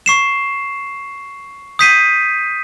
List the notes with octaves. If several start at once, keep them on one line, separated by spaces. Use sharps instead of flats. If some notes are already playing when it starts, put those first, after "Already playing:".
C#6 C7 E7
D#6 G6 B6 C7 D#7